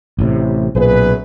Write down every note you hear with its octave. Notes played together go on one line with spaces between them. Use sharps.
A1 A2 C3
B1 F#2 A#2 G#4 B4